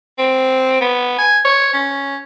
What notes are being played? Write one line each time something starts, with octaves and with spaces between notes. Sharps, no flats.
C4
B3
G#5
C#5
C#4